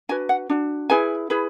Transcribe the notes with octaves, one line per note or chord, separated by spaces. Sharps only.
D4 F#4 B4 G#5
F#5
D4 F#4
E4 G#4 B4 G#5
E4 G#4 B4